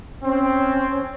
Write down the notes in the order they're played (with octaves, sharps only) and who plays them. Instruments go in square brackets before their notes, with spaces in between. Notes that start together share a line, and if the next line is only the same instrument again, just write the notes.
[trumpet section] C4 [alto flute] C#4